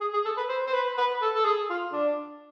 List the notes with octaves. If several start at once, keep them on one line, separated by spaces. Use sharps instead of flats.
G#4
G#4
A4
B4
C5
C5
B4
B4
A4
A4
G#4
F4
D4